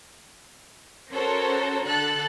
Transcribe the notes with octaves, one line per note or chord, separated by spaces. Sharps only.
C#4 F#4 A4 A#4 C5 C#5
D3 A4 F#6 A6